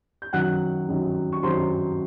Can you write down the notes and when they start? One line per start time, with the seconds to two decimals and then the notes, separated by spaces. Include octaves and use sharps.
0.22 G6
0.33 F#2 D#3 F#3 F#5 F#6
0.88 F#2 D#3 F#3
1.32 C#6
1.43 F#2 D#3 F#3 C5 C6